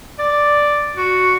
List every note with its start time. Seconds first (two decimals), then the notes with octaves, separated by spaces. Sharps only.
0.19 D5
0.97 F#4